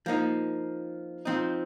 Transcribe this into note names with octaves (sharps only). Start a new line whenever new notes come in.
F3 A#3 D#4
F3 C4 D#4